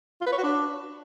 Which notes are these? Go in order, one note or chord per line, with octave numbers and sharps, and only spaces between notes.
F4
B4
C#5
F#4
D4